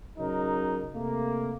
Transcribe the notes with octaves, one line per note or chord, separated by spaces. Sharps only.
C#3 F#3 D#4 A#4
C3 A3 A#3